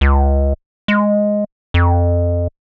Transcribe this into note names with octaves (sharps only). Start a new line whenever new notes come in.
C#2
G#3
F2